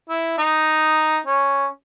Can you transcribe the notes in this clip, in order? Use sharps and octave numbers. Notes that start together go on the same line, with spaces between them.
E4
D#4
C#4